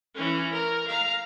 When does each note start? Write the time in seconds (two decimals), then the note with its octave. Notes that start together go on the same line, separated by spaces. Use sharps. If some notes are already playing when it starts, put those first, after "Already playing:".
0.15 E3 C#4
0.52 A#4
0.87 F5 A#5